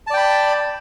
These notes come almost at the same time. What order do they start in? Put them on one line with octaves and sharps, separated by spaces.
A5 D5 G5 B5